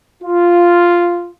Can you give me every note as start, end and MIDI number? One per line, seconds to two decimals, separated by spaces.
0.23 1.32 65